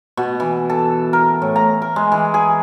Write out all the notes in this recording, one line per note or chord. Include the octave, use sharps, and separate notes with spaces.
B2
E3
A4
A#4
A2
A#5
A#4
G#3
E3
G#4